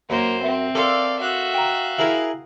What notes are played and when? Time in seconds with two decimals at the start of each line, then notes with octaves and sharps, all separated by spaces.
0.10 F#2 A#3 C5
0.43 C4 E5
0.75 A4 A#4 D5 F5 C6
1.19 F#4 E5 F5 F#6
1.54 G5 A#5
1.98 E4 G#4 A#4